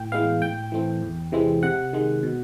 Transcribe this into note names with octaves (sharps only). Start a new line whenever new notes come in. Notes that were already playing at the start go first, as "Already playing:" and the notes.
Already playing: A2 G5
E3 G#3 B3 F5
A2 G5
E3 A3 C4
E2
C3 E3 G#3 C4
C3 F#5
D#3 G#3
B2